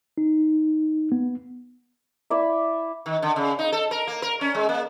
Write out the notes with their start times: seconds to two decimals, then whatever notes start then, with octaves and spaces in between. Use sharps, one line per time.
0.18 D#4
1.12 B3
2.30 E4 D5 E5
3.06 D#3
3.22 D3
3.36 C#3
3.59 D#4
3.72 A4
3.91 A#4
4.07 A#3
4.22 A#4
4.41 C#4
4.55 G#3
4.69 A#3